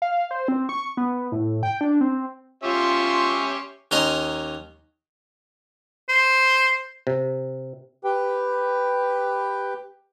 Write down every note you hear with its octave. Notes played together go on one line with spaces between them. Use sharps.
F5
C5
C4
C#6
B3
A2
G5
D4
C4
C#4 F4 G4 E5 C6 C#6
D#2 C#4 D#5 A#5 C6
C5
C3
G4 B4 G5